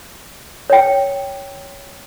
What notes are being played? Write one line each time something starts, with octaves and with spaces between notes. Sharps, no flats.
C#5 G5